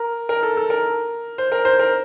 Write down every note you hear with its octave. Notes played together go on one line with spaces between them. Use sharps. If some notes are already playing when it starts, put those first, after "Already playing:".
Already playing: A#4
A#4
A4
A4
A#4
C5
A#4
C5
A#4